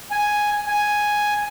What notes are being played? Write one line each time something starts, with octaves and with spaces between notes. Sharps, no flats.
G#5
G#5